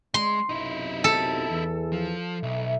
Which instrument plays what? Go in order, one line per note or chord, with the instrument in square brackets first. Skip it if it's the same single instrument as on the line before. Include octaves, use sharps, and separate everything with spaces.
[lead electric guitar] G#3 [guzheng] C6
[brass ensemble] B1 F#2 C3 [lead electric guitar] D#4 E4
[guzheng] A4
[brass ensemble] E2 E3
[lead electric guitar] F3
[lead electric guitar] B1 [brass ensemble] E5